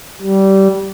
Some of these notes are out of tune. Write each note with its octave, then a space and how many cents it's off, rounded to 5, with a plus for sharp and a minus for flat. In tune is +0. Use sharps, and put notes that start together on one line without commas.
G3 -20